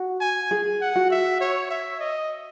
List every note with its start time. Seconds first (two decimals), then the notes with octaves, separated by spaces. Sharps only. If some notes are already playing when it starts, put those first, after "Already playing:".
Already playing: F#4
0.21 G#5
0.51 G#4
0.81 F#5
0.96 F#4
1.11 E5
1.41 C#5
1.70 E5
2.00 D#5